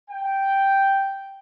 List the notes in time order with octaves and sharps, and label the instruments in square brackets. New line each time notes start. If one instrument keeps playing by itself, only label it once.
[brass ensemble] G5